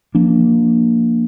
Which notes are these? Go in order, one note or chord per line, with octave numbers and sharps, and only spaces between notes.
F3 A#3 D4